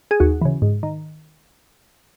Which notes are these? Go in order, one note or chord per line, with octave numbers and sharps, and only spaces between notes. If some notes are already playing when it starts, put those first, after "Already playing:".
G#4
D#2 F#4
C#3 E3
G#2
D#3